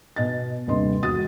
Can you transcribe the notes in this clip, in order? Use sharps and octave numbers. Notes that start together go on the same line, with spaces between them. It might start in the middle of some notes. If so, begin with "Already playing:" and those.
B2 D#5 A6
D#1 G2 C3 D#5 C6
E1 F#4 D#6 A6